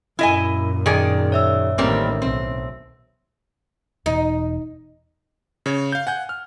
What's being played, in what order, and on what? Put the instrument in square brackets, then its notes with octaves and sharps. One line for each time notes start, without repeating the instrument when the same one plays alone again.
[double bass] F#2 A#2 [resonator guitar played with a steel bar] E4 D#5 G#5
[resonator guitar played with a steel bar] D#3 G#4 D5
[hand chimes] C#5 E5 E6
[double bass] A1 D#3 [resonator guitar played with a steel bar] G3 A#3 C4
[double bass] B1 [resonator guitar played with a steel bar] C4
[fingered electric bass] E1 E2 B2 [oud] D#4
[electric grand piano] C#3 C#5
F5 G6
F#5 G#5 G6
F6